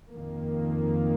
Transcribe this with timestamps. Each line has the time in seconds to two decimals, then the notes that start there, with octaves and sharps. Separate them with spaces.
0.12 F2 D#3 A#3